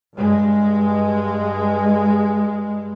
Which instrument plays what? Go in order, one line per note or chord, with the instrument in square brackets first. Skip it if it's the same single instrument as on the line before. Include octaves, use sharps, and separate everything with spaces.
[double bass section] G2 G#3